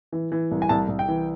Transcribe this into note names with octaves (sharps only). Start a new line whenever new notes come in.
E3
E3
C2
G#5
C2 A5
C2
G5
E3